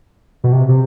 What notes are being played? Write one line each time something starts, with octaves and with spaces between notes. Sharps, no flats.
B2
C3
C3